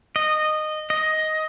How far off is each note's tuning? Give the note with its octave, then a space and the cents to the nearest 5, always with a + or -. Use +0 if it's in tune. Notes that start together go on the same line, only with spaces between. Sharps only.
D#5 -15
D#5 +10